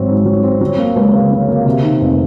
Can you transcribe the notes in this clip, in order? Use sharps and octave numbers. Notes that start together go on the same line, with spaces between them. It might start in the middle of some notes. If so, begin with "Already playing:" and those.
Already playing: G#1 F#3 C4
G#2
F#3
C4
F#3
A#3
C#2
C#3
F#3
A#3
C3
D#3
F1